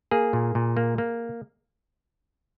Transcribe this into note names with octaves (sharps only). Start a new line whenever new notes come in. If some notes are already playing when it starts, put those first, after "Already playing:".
A#3 G#4
A#2
A#2
A#3
A#3